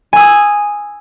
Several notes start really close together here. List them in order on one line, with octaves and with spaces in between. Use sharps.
G#5 E6 D#6